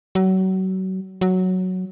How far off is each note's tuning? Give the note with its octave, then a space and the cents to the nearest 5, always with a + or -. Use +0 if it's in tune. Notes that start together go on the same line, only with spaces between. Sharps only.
F#3 +30
F#3 +0